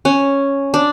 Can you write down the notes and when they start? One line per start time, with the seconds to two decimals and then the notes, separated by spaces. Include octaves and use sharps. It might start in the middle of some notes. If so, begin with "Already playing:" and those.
0.05 C#4
0.74 D4